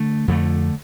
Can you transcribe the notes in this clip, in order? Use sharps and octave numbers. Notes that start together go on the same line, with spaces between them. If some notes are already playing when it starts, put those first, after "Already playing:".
Already playing: D3 A3
F2 D3 A3